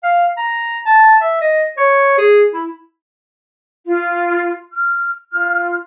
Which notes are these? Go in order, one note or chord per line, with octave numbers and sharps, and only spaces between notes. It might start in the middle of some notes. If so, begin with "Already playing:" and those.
F5
A#5
A5
E5
D#5
C#5
G#4
E4
F4
F6
F4 F6